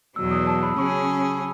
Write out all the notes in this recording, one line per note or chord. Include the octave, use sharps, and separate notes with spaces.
E2 B2 F#3 E6
D#6
A5
B5
C#3 F#3 C#4 G#4 C#6